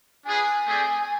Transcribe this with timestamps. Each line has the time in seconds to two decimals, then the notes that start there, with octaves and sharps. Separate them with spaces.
0.24 D4 F4 G#4 B4 G#5
0.66 A3 C4 G#4 D5